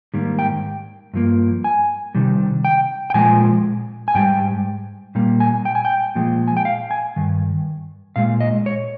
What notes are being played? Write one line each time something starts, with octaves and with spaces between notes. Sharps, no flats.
G#2 D#3 G3 A#3
G5
G2 F3 A#3
G#5
C3 D#3 G3
G5
G5
A#2 F3 G#3 G#5
G#5
G#2 G3 G5
A#2 G3 A#3
G#5
G5
G#5
G5
A#2 F3 G#3
G#5
G5
F5
G#5
G2 D#3
A#2 G#3 F5
D#5
C#5